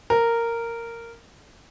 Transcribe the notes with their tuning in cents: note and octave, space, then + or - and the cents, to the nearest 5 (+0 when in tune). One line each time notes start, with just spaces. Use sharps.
A#4 -10